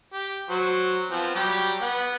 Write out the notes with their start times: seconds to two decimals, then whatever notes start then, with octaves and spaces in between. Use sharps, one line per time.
0.14 G4
0.50 F#3 F#4 C5
1.11 F3 B3 C4
1.35 F#3 G3 G4
1.82 B3 F#5